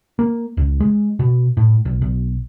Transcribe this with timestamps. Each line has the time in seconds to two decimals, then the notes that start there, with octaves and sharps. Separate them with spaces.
0.19 A#3
0.57 C#2
0.80 G#3
1.19 B2
1.57 A2
1.85 B1
2.02 B1